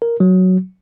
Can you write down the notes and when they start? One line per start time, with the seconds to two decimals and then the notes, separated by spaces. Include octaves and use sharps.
0.02 A#4
0.20 F#3